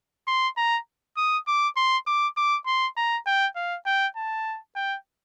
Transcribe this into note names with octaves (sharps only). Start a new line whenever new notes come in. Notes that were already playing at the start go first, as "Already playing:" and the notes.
C6
A#5
D#6
D6
C6
D6
D6
C6
A#5
G5
F5
G5
A5
G5